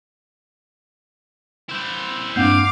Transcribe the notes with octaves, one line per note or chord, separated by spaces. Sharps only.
E4 C5
G2 A#3 C4 D4 F5 F#5 D6 G6